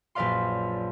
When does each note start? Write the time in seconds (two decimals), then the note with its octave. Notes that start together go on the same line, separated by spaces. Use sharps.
0.15 A#1 F#2 B4 D5 F5 C6